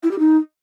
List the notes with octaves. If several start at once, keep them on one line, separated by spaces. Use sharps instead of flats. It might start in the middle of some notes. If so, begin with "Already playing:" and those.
E4
G4
D#4